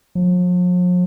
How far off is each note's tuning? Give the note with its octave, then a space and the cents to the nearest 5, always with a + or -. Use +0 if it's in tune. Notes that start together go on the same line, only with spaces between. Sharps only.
F3 +45